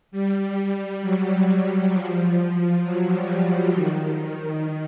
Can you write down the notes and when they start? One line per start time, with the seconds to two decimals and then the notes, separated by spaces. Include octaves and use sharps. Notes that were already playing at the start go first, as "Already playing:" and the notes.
0.11 G3
1.02 F#3
1.92 F3
2.83 F#3
3.13 G3
3.44 G3
3.74 D#3